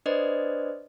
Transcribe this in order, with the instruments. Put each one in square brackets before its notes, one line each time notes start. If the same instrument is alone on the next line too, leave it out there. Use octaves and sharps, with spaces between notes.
[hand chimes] D4 B4 C5 D5 D#5